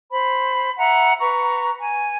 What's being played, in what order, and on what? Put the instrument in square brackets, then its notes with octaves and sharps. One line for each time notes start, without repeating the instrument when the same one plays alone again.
[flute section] C5 B5
E5 F#5 A#5
B4 A#5 C#6
G#5